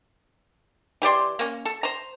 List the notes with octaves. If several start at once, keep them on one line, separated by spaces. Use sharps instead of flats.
E3 G4 D5 C6
A#3 C#4
A4
C5 A#5